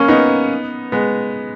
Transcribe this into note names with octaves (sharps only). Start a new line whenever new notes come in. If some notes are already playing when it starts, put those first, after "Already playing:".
Already playing: A#3 C#4
B3 D#4
G#3 B3